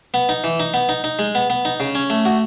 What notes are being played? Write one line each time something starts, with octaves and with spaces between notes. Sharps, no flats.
B3
D#4
E3
D#4
B3
D#4
D#4
G#3
B3
B3
D#4
C#3
C#4
A3
F#4